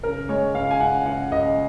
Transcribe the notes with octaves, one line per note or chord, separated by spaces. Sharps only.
C#3 A#4
G#3 C#5
C#2 F5
G#5
C#2 F#5
C#2 F#5
C#2 D#5